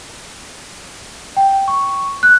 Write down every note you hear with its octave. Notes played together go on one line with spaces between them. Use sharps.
G5
C#6
F#6